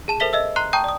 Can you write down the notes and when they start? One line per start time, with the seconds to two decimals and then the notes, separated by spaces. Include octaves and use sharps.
0.08 G#4 A5 E7
0.20 A4 A#4 C5 E5 B6 G7
0.33 D#5 E5 E6
0.56 A#5 C6 F#6 C7 G7
0.73 G5 A5 A#5 C#6 D#6 G6
0.84 D5 D#6